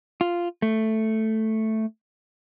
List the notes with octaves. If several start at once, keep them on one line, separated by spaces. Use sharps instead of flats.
F4
A3